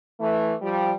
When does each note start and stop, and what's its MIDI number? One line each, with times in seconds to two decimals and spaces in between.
0.20 0.53 52
0.20 0.53 57
0.62 0.93 53
0.62 0.93 55